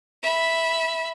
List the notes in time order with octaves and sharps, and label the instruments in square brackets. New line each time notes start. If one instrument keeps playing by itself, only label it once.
[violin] E5 B5